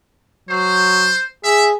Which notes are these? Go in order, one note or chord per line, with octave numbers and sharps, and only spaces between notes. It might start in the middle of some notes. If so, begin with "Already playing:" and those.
F#3 C5
G#4 E5